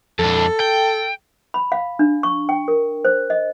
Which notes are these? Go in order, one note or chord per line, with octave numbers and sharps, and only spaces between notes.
F2 D4 A4
G5
B5
F5
D4
C#6
G5
A#4
C5
D#5